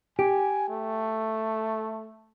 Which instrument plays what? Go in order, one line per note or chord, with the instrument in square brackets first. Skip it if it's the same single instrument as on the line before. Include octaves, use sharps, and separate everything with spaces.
[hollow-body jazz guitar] G4 [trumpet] G#5
[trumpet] A3